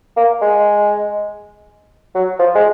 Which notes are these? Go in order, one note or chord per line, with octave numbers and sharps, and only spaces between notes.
A#3
G#3
F#3
F3
G#3